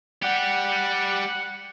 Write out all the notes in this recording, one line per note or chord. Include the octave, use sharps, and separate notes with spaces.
G3 G4 F#5